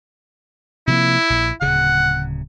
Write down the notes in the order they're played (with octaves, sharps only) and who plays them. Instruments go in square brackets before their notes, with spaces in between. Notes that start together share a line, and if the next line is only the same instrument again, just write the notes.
[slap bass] C3 F3 A#3 [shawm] E4
[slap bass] A#1
[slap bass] D1 C#3 [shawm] F#5